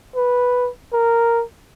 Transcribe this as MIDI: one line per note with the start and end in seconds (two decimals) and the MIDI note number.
0.16 0.70 71
0.93 1.44 70